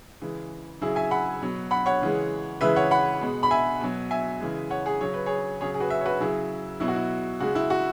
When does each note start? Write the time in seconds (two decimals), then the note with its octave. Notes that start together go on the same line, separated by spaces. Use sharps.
0.21 C#3 E3 G#3
0.81 C#3 F#3 E4 G#4
0.96 E5 G#5
1.11 F#5 B5
1.42 B2 F#3
1.71 F#5 B5
1.86 C#5 F#5
2.01 C#3 E3 G#3
2.61 C#3 E3 G#3 B4 E5
2.76 C#5 F#5
2.91 F#5 B5
3.21 B2 G#3
3.43 B5
3.51 E5 G#5
3.81 B2 F#3
4.11 E5 G#5
4.41 C#3 E3 G#3
4.71 C#5 F#5
4.86 G#4 C#5
5.01 C#3 F#3 C#5
5.14 B4
5.26 G#4 C#5
5.61 C#3 F#3 G#4 C#5
5.74 G#4
5.80 F#4 B4
5.90 B4 E5
6.01 C#5
6.05 F#4 B4
6.20 C#3 F#3 E4 G#4
6.80 B2 F#3 E4
6.88 F#4
6.95 E4
7.40 C#3 G#3 F#4
7.55 E4
7.70 F#4